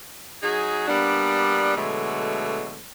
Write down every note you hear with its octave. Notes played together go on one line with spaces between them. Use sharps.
F#3 D#4 G#4
G3 A#3 B3 D4
B2 D3 F#3 G#3 A3